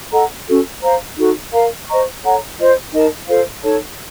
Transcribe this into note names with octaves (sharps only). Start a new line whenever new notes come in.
A4 D#5 F#5 A#5
C#4 F#4 A4
C5 F5 A#5
D#4 F#4 A4
A#4 F5 A#5
C5 D#5 A#5 C#6
A4 C#5 F#5 A#5
F4 C5 D#5
D#4 A#4 D#5 A5
F4 A4 C5 F5
D#4 A4 C#5 A5